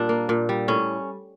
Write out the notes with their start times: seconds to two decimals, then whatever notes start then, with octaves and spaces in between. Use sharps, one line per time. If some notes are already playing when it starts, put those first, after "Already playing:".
Already playing: A#2 G3 D4
0.09 A#3
0.29 A#2
0.49 G3
0.68 A2 C#4